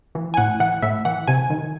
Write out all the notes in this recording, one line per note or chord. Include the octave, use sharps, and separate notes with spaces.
E3
G#5
A2 F#5
E3 F#5
A2 E5
E3 F#5
C3 G#5
D#3